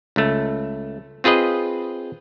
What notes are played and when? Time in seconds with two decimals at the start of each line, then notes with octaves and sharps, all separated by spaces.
0.16 C#2 A3
1.24 C4 F4 G#4 B4 D#5